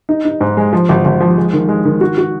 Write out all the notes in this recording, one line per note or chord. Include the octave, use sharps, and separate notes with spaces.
D#4
D#4
G#2
G#3
F3
G#1
G#1
F3
G#3
D#3
G#3
D#3
F#4
F#4